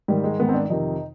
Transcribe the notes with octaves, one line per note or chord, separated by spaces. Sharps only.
G#2 D#3 G3
G#3
G#2 D#3 B3
C4
D4
D4
F2 C3 D#3 D#4